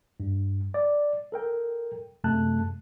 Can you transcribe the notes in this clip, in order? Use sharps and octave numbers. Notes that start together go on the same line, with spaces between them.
G2
D5
A4 A#4 G5
F#2 C3 G#3 A3 A5 F#6